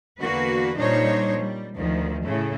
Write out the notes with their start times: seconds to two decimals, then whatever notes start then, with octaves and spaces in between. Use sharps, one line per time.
0.18 E2 D3 A#3 F#4 B4
0.76 A#2 G3 D4 D#4 C5 C#5
1.37 G3
1.76 D2 D#3 F3
2.23 A2 C#3 A3